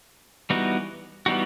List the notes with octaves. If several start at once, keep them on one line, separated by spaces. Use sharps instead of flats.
E3 G3 B3 D#4 F#4
E3 G3 B3 D#4 F#4